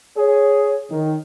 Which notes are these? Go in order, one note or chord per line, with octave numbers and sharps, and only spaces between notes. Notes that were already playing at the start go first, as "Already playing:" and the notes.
G#4 C#5
D#3